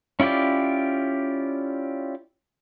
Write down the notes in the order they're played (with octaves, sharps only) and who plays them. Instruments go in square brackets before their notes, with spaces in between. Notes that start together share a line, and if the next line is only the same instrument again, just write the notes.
[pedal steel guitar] C#4 E4 F4 G4 D5